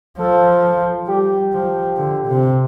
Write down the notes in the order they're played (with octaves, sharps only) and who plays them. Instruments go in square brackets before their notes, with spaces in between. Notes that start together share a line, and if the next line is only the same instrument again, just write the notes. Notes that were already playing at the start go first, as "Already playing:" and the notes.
[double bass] F3 [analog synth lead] A4
[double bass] G3 [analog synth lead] G4
[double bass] F3
D3
C3